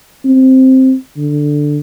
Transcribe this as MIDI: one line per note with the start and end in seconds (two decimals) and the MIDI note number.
0.25 0.94 60
1.17 1.79 50